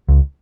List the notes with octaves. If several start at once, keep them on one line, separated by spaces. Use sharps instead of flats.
C#2